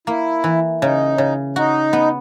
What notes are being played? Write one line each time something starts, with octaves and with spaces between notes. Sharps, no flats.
A#3 E4
E3
C#3 D#4
C#3
D#4 F#4
B3